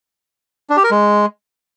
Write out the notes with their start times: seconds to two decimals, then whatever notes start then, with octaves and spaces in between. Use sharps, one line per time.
0.70 D4
0.77 G4
0.84 A#4
0.91 G#3